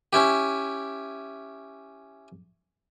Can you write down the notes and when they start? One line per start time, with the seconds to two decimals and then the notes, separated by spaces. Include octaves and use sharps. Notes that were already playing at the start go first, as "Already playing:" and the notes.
0.13 C#4 E4 G4